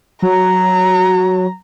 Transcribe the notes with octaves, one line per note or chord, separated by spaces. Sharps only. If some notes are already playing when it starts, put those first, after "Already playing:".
F#3 A#5